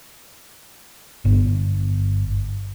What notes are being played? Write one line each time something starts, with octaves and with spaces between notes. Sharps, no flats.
G1